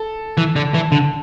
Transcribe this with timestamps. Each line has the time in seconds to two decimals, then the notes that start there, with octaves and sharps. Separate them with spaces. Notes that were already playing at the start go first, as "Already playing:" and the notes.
Already playing: A4
0.38 E3
0.56 D3
0.74 E3
0.92 D3